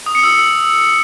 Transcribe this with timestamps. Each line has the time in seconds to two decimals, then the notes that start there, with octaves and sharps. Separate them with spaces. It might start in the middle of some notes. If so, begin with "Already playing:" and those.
0.06 D#6
0.15 C#7
0.23 E6